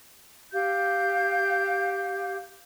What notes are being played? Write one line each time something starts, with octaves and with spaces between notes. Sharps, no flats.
G4 F5 G6